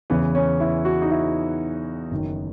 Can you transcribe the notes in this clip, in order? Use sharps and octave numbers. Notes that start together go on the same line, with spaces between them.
E2 C#3 E3 B3
C#4
E4
F#4
D#4
E4
F#1 F#2 D#3